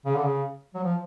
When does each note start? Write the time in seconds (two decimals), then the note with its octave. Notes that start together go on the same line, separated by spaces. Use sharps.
0.06 C#3
0.15 D3
0.24 C#3
0.74 F#3
0.83 F3